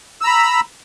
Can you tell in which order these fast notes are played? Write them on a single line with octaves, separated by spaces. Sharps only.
E6 A#5 B5